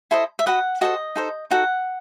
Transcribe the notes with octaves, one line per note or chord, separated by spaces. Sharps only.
E4 A4 C5 D#5
E5
F#4 B4 D#5 F#5
F#4 A4 C5 D#5
D#4 A4 C5
D#4 F#4 A4 F#5